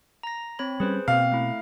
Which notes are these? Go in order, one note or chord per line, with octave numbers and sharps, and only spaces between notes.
A#5 A#6
C4 C#5 B5
G3 C#4 G#4 B4 C5
B2 A#3 C4 F5
A3 E4